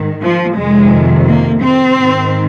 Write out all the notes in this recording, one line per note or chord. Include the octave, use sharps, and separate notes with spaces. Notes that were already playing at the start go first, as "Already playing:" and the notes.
Already playing: G#2 D#3
F3
F2 C3 D#3 G#3
A#3
C4
G#2 D#3